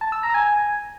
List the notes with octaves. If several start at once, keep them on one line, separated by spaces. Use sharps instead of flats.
A5
E6
A#5
G#5